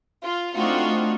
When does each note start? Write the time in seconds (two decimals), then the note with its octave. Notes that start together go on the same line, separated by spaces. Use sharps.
0.24 F4
0.56 A3 C4 D4 D#4 F4 F#4